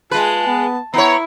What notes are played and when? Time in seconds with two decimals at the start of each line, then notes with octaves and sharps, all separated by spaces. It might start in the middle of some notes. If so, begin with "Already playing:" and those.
0.11 G#3 F4 B4 A5
0.47 B3
0.94 B3 E4 C#5 A#5